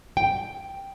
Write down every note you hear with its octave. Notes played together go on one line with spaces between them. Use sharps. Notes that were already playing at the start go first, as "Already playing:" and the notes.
G5